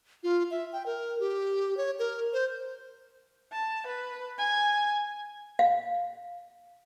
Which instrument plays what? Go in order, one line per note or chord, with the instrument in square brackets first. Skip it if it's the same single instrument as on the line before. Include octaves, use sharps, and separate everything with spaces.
[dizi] F4
E5
G5
A#4
G4
C#5
A#4
C5
[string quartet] A5
B4
G#5
[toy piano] F5